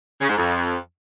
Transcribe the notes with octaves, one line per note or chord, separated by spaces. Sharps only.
C#3
G#2
F2